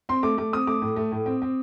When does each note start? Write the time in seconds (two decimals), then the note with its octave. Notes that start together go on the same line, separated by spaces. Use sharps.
0.09 C4 C6
0.23 A3 D6
0.37 A3 D6
0.53 C4 D#6
0.67 A3 D6
0.82 A2
0.96 A3
1.12 A2
1.26 C4
1.42 C4